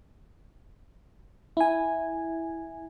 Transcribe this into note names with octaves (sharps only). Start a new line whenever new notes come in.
E4 G#5